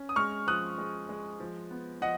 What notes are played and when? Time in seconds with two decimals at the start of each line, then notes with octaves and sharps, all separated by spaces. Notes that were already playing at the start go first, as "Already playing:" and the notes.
Already playing: C#4
0.09 D#6
0.16 G#3 C#6 F6
0.47 F3 D#6 F#6
0.78 G#3
1.09 G#3
1.40 F3
1.71 B3
2.01 F3 D#5 F#5